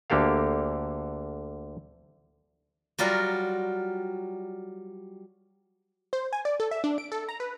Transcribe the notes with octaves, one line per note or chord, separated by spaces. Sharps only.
D2 D3 A#3 G4 A4 F5
F#3 G3 F4 F#4 A#4
C5
G#5
D5
A4
E5
D4
D7
A4
A#5
B4